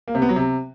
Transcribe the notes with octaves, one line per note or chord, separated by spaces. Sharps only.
A#3
C3
B3
F#3
C3